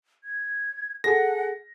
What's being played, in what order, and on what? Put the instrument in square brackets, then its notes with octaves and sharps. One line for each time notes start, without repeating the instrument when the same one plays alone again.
[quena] G#6
[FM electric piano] G#4 A4 [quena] F#5 [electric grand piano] A#6